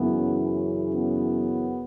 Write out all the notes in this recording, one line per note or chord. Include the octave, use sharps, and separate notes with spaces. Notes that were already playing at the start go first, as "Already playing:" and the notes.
Already playing: F#2 C#3 E3 B3
B3